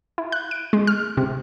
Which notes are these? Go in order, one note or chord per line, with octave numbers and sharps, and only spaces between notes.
E4
F#6
D7
G#3
F6
C3